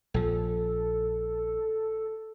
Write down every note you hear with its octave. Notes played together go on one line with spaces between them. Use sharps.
A#1 F3 A4